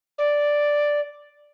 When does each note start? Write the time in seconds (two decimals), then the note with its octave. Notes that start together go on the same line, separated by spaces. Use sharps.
0.18 D5